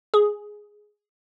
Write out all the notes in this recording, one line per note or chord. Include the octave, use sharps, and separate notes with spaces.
G#4